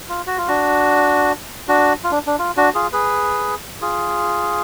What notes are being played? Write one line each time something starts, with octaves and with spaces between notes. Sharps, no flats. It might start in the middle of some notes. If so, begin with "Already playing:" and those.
F4
F#4
F4
D4 F#4
D4 F#4
F4
D4
D4
F4
D4 F#4
F4 G#4
G#4 B4
F4 G#4